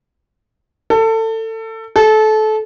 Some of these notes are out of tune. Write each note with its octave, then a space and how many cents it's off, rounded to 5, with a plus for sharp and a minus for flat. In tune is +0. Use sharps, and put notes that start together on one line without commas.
A4 +25
A4 -25